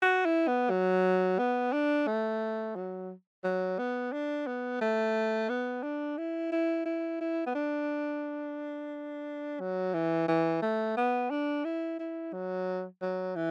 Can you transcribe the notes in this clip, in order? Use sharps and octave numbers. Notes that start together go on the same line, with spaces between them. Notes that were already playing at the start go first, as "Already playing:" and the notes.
F#4
E4
B3
F#3
B3
D4
A3
F#3
F#3
B3
D4
B3
A3
B3
D4
E4
E4
E4
E4
B3
D4
F#3
E3
E3
A3
B3
D4
E4
E4
F#3
F#3
E3